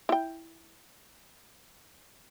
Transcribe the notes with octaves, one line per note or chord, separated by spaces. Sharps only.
E4 G5